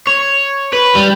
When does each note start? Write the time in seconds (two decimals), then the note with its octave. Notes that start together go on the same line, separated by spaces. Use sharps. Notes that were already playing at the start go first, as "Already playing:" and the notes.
0.07 C#5
0.73 B4
0.95 G3